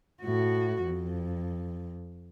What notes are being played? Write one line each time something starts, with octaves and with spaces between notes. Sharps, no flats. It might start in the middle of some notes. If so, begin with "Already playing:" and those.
A2 F#4
F2